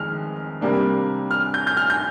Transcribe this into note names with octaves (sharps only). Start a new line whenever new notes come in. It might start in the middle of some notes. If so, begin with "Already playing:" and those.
Already playing: F2 D#3 G#3 F6
C3 G3 A#3 D4
F6
G6
G6
F6
G6